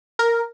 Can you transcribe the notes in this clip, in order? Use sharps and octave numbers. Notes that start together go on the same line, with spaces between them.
A#4